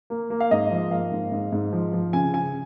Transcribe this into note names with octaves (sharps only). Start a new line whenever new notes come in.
A#3
A#3
F5
G#2 D#5
F3
A#3 F5
G#2
G#2
G#2
F3
F3
C#3 G#5
C#3 G#5